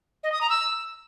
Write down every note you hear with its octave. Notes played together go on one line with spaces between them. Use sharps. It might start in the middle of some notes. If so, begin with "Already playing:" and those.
D#5
D#6
A#5
E6